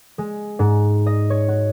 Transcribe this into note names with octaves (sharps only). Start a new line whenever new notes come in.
G#3
G#2
D#5
C#5
F#4